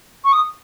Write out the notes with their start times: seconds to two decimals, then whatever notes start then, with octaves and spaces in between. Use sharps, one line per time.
0.24 C#6
0.32 D#6